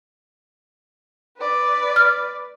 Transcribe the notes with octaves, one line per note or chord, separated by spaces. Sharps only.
B4 D5
F6